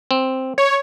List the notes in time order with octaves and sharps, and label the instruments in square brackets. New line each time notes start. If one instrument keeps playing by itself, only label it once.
[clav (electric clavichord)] C4
[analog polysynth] C#5